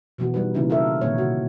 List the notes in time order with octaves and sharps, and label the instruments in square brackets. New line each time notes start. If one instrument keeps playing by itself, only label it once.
[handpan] B2 E3 B3 F#4
G3 D#4 F#4 B4
C#3 E3 A#3 D#4 E4
F4 A4 A#4 E5
A#2 D#3 A#3 C4 C#5
C3 F#4